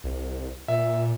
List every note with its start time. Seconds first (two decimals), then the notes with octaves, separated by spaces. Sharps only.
0.04 C2
0.68 A#2 E5